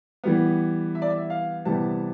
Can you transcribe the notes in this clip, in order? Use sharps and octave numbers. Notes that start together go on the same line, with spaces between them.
E3 G3 B3
E5
D5
E5
F5
C3 E3 G3 B3 A5